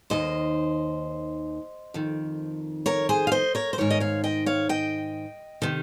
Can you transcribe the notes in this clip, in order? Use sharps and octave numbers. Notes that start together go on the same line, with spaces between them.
D#2 D#3 C5 D#5
F2 D#3
A#4 C#5
G#4 C5
F5
C5 D#5
A#4 C#5
C5
G#2 D#3 A#4 C#5
D#5
C#5 F5
D#5 G5
C#5 F5
D#5 G5
C3 D#3